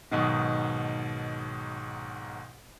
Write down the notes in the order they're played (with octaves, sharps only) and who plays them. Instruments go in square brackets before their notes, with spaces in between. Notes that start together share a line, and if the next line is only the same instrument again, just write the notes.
[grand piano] B1 G#2 B2 D#3